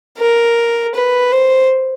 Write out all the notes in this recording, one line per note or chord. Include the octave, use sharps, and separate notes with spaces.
A#4
B4
C5